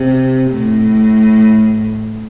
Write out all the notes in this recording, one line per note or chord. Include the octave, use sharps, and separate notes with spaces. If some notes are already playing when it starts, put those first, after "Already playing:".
Already playing: C3
A2